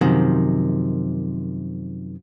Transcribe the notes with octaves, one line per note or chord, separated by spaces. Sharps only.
F#2 C3 D#3 F3